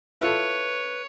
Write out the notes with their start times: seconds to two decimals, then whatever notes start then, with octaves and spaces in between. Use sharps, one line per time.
0.21 E4 F4 A4 B4 C#5